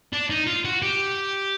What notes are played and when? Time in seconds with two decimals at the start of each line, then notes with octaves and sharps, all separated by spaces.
0.13 D4
0.30 D#4
0.47 F4
0.65 F#4
0.82 G4